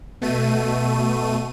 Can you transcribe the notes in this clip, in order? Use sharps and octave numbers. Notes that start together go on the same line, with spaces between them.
B2 A3 D#7